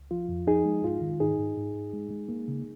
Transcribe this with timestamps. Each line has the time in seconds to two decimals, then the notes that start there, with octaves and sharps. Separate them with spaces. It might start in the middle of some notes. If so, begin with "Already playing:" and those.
Already playing: C#2
0.11 F3 F4
0.29 F2
0.47 F3 D#4 G#4
0.66 G#3
0.84 G#2 F4
1.01 D#3
1.20 G#2 D#4 G#4
1.39 G#2
1.57 G#2
1.75 G#2
1.93 G#3
2.11 G#3
2.29 A#3
2.48 C#3